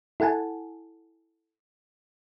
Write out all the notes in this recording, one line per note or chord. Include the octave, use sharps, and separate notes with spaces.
E4 A4 F#5 G#5 A5